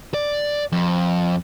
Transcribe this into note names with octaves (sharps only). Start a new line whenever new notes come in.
D5
F2